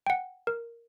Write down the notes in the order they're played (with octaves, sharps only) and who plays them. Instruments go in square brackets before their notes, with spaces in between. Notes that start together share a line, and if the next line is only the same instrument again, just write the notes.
[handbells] F#5 G5
A#4